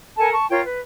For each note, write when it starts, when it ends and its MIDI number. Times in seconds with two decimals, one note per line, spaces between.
0.18 0.32 69
0.18 0.32 70
0.18 0.32 80
0.18 0.32 81
0.33 0.47 81
0.33 0.47 85
0.50 0.61 65
0.50 0.61 70
0.50 0.61 73
0.50 0.61 79
0.64 0.78 71